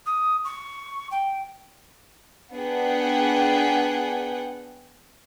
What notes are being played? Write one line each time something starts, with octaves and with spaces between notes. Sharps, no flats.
D#6
C#6
G5
B3 D4 G#4 F#5 G5